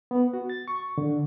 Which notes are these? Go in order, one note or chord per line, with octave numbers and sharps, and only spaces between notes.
B3
F#4
A6
C#6
D3